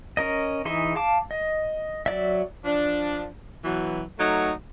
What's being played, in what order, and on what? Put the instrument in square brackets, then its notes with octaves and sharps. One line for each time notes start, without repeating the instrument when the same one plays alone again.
[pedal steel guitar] C#4 A#4 D#5
E3 D#4 G#4 E5 C6
F5 A5 D6
D#5
F#3 D5 E5
[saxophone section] F3 D4
B2 E3 F#3
F#3 A3 D#4